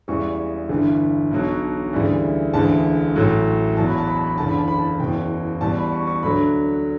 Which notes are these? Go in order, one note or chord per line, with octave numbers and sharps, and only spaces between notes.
E1 E2 C#3 E3 G3 C#6
G1 G2 E3
B1 B2 F#3
D2 C#3 E3 G3
E1 D2 C#3 E3 A5
A1 A2 F#3
E1 E2 B2 F#3 A5
B5
A5
B5
A5
B5
F#1 E2 D3 A5
B5
A5
B5
A5
F#1 E2 B2 G5
E2 B2 G3 A5
B5
C#6
C#6
D2 D3 F#3 B5